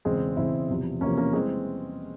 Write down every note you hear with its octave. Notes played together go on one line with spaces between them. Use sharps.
E1 E2 C#3 G#3 C4
E1 E2 C#3 C4 E4
E1 E2 C3 F3
E1 E2 C3 F3 A#3 C#4
A#3 C#4
E3 G3 G#3 C4